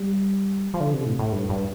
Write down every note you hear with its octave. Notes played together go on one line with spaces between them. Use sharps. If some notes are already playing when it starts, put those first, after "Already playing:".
Already playing: G3
F3
D3
C3
A2
A2
G2
G2